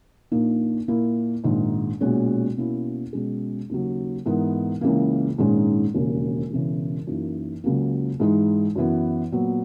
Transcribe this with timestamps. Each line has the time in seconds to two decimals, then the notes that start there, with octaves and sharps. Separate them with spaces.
0.32 A#1 A#2 A#3 D#4
0.88 A#2 A#3 E4
1.44 A#1 G#2 D#3
2.01 B1 A#2 G#3 C#4 F#4
2.57 B2 A#3 C#4 E4
3.13 B2 G#3 C#4 G#4
3.69 D#2 C#3 F#3
4.26 G#2 E3 B3 D#4 A#4
4.81 C#2 C#3 E3 A#3
5.38 A#1 G#2 D#3 G#3 C#4
5.94 E1 D#2 C#3
6.51 E1 E2 C#3 E3
7.07 F#2 E3 A#3 D#4
7.64 C#2 C#3 F#3 A#3
8.20 G#2 E3 G#3 D#4
8.75 F#2 E3 B3
9.32 A#2 F#3 B3